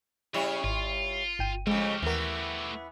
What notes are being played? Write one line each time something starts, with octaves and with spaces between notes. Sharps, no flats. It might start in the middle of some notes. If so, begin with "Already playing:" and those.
C#3 G3 E4 C#5
G#1 F4
G1 G5 D#7
F2 C#3 G#3 A3 G4
D#2 E3 B3 A#4